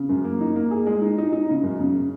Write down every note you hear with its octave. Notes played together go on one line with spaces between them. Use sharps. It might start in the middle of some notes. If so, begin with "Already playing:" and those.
Already playing: C#3
F#2
A#3
D#4
A#3
G#4
G#3
D#4
D#4
D#4
C#3
F#2
C#3